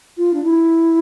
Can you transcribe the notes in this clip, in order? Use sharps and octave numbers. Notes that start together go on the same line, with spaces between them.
F4
D4
E4